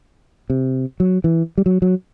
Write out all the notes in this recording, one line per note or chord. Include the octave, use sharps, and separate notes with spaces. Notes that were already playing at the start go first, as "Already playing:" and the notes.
C3
F#3
E3
G3
F#3
F#3